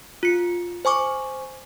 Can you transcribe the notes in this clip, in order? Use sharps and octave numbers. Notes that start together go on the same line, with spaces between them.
F4 C#7
C5 G#5 C#6 D6